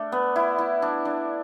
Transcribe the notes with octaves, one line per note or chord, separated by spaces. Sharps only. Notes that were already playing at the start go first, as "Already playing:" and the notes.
Already playing: A3 D4
B3
E4
E4
D4
D4